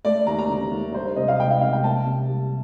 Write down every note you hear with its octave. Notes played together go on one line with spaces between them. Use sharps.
A3 D5
D#2 A#5
A#5
D3
D#2
G3 C5
C5
C2 D#5
F5
C3 G5
F5
C2 F5
G5
A#3 A5
C3
G3